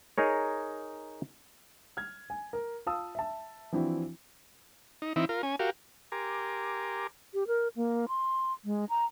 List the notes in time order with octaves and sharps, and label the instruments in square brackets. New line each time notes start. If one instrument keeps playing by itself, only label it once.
[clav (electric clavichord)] D#4 G#4 A#4 C#5
[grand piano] F6 G#6
G#5
A#4
F4 F5 A5 D#6 E6
E5 A5
E3 F3 C4 D4 E4 F#4
[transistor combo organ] D#4
E3 C4 D#4 E4
F4 A#4
C#4 G#5
F#4 G4 A#4 F5
G4 A#4 G#5 A#5 C6 D6
[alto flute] G4
A#4
A#3
C6
G#3
A#5